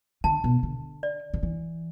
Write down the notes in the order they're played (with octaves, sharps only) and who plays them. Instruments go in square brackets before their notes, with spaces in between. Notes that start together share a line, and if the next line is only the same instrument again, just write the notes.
[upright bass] D3 [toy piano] A5
[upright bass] B2
D3
[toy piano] D5
[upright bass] D3
E3